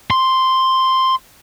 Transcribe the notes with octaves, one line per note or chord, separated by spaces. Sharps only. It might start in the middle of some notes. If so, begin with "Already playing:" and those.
C6